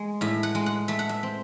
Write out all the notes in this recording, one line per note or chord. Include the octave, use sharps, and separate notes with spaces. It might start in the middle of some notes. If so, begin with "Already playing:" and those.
Already playing: G#3
A2 E5
F#5
G#3
F#5
A3 E5
F#5
E5
C4